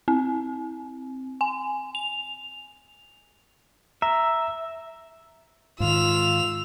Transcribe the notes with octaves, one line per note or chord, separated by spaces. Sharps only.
C4
G#5
F7
E5 A#5
G#2 D#3 F4 E6 F7